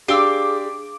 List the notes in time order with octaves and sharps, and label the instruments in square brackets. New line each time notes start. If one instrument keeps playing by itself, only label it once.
[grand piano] D4 G4 G7 [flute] G#4 [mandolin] F5 C6 E6 [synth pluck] D6